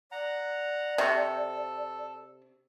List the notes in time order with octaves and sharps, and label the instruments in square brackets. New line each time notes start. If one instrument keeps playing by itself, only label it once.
[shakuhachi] D5 [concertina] F#5 A#5
[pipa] C3 C#6 [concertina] A4